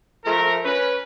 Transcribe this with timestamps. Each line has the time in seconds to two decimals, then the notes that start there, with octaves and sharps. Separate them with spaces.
0.25 F3 A3 A#4
0.65 C#4 B4